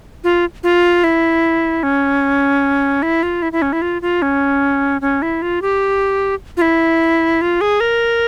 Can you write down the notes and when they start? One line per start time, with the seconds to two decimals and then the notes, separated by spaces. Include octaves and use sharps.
0.24 F4
0.63 F4
1.04 E4
1.83 C#4
3.02 E4
3.23 F4
3.42 E4
3.52 E4
3.62 C#4
3.73 E4
3.82 F4
4.02 F4
4.22 C#4
5.01 C#4
5.22 E4
5.42 F4
5.62 G4
6.57 F4
6.62 E4
7.41 F4
7.61 G#4
7.80 A#4